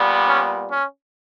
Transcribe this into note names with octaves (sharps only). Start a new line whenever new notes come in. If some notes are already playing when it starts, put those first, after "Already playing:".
Already playing: A#2 G3 B3
C#4
C#4